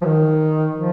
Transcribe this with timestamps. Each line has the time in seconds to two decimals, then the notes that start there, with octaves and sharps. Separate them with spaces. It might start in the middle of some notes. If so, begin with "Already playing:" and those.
0.01 F3
0.05 D#3
0.76 F3